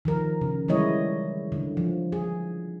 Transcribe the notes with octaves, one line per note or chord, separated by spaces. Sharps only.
D#3 F3 A#4
C#3
E3 G3 G#3 E4 C#5 D#5
D3
F3
G#4